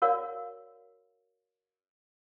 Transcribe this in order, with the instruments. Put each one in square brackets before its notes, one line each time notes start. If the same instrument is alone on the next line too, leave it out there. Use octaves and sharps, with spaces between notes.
[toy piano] F#4 A#4 C#5 D5 F5